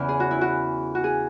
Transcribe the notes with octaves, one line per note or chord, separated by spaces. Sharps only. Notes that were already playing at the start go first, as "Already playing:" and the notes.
Already playing: E2 C#3 E3
G#4
F#4
E4
F#4
F#4
G#4